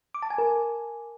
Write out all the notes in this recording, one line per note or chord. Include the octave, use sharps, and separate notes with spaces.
D6
A5
G#5
A#4